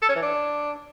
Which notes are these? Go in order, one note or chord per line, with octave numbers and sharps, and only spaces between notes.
A4
C#4
E3
D4